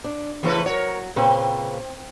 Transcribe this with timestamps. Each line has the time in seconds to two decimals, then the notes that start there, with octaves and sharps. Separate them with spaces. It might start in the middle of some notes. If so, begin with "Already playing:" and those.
0.04 D4
0.43 E2 C#3 E3 A3 E4 B4
0.66 F#3 A#4 C#5
1.16 A#2 C#3 C4 B4